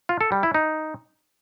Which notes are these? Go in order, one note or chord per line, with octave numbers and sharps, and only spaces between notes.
F4
A4
G3
E4
D#4